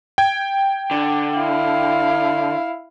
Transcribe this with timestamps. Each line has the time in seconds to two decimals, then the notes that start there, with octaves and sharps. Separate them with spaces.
0.18 G5 G#6
0.91 D3
1.37 E4 F5